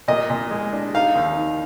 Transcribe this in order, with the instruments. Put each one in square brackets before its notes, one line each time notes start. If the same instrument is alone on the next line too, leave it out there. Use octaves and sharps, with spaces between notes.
[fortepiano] A#2 D#5
A#2
G#3
D4
D#4 F5
D#2
D#3